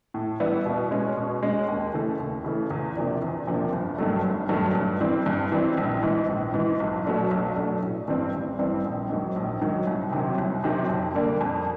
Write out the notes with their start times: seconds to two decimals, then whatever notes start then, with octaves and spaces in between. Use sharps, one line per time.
0.14 A2
0.40 E3 G3 B3 E4
0.66 B2
0.91 G#3 C#4
1.17 B2
1.43 G#3 C#4
1.68 D#2
1.93 C#3 E3 A3
2.19 D#2
2.44 C#3 E3 A3
2.71 E2
2.96 C3 F3 A#3 D4
3.22 E2
3.47 C3 F3 A#3 D4
3.73 G1
3.98 G2 D#3 F#3 A3
4.24 G1
4.49 G2 D#3 F#3 A3
4.75 G2
5.01 E3 G3 C4
5.26 G2
5.52 E3 G3 C4
5.77 A#1
6.03 G#2 E3
6.29 A#1
6.54 G#2 E3
6.80 B1
7.06 B2 F#3 A3 D4
7.31 B1
7.57 B2 F#3 A3 D4
7.82 A1
8.08 G2 E3 G3 C4
8.34 A1
8.59 G2 E3 G3 C4
8.85 A#1
9.10 G#2 D#3 F#3
9.36 A#1
9.61 G#2 D#3 F#3
9.87 C2
10.12 C3 D#3 F#3
10.38 C2
10.64 C3 D#3 F#3
10.89 F2
11.15 D3 G3 A#3
11.41 F2